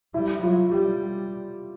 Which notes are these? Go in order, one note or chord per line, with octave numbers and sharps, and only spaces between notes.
G3 E4
F#3 F4
G3 G4